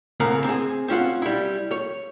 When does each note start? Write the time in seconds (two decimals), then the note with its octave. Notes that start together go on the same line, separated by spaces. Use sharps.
0.20 A2 C#3 C4 A#4 F#5
0.44 C4 G#4
0.88 C4 C#4 F4 F#5
1.22 G3 E4
1.71 C#5